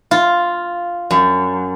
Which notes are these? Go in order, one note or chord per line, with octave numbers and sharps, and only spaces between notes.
F4
F#2